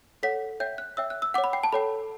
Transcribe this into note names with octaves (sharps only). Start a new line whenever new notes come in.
A4 C#5 F#5 B6
C#5 E5 G5 G6
F#6
C#5 E5 G5 E6
F#6
E6
C#5 F#5 D6
B5
G5
A5
A4 C#5 G5 B5